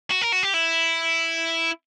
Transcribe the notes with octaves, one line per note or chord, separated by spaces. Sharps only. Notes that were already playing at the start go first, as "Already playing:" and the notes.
F#4
A#4
F#4
G4
E4